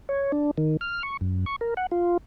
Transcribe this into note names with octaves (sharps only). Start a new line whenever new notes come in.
C#5
D4
D#3
F6
C#6
F#2
C#6
A#4
F#5
F4